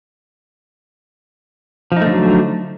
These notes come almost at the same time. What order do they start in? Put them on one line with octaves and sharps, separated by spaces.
F3 D#4 A3 D3 F#3